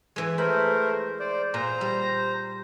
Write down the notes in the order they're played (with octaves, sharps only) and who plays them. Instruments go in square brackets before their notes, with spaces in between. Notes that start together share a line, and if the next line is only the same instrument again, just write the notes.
[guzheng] E3 G#3
[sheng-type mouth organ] A3 A#4 C5 [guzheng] B5
[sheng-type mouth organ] C5 D5
[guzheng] A#2 [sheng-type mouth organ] C5 A#5
[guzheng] G3